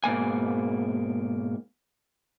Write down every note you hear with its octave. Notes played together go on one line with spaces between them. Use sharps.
G#2 B2 A#3 G#5